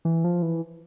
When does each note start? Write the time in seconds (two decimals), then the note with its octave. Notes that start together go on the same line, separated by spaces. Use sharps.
0.05 E3
0.24 F3
0.42 E3